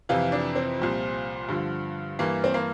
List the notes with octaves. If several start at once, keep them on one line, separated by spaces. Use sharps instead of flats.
F2 C3 E3 F4
D4
C4
C2 A#2 F3
G2 D3 F3
G2 E3 A#3
C4
A#3